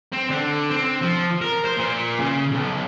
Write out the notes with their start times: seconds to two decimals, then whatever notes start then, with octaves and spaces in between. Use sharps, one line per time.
0.13 C4
0.30 D3
0.71 C4
1.02 F3
1.41 A#4
1.65 C5
1.77 A#2
2.19 C#3
2.51 B1